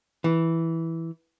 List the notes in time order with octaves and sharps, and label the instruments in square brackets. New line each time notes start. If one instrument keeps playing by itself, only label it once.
[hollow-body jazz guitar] E3